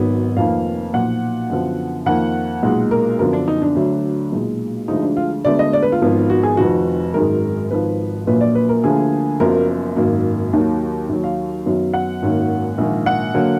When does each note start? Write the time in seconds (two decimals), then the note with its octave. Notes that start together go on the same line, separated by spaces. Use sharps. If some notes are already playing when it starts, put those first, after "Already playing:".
Already playing: G#1 G#2 F#3 B3
0.37 F1 F2 D#3 A#3 F5
0.94 B1 A#2 F3 F#5
1.50 F#2 D3 F3 B3
2.06 F2 D#3 A#3 F#5
2.63 B1 A#2 G#3
2.91 A#4
3.19 F#2 D3 F3 B3 A#4
3.33 D4
3.48 D#4
3.62 D4
3.76 D2 D3 F#3
4.32 B1 A#2 G#3
4.88 D2 D3 F3 G#3 D#4
5.03 D4
5.17 F4
5.45 D2 D3 G#3 B3 D5
5.59 D#5
5.73 D5
5.83 B4
5.92 F4
6.01 G#1 G#2 F3 B3
6.30 F#4
6.43 G#4
6.57 F1 F2 D#3 F#4
7.14 G#1 F#2 D#3 G#3 A#4
7.70 G#1 G#2 F3 B4
8.27 A#1 A#2 F#3 A#3 B4
8.41 D5
8.55 B4
8.69 A#4
8.84 D2 D3 F3 A#3 G#4
9.40 F#1 F#2 F3 B3 A#4
9.96 G#1 F#2 D#3 A#3
10.53 D#2 D#3 F#3 A#3
11.09 D#2 D#3 F#3
11.24 F5
11.66 F#2 D#3 F#3 B3
11.93 F#5
12.22 G#1 F#2 D#3 F#3 A#3
12.78 A#1 G#2 D#3 A#3
13.06 F#5
13.34 D3 F#3 A#3